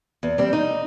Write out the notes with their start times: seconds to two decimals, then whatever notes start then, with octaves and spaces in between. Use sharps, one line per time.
0.23 E2
0.38 G3 C4
0.53 D#4